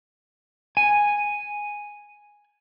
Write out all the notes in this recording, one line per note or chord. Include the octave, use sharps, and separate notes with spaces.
G#5 D#7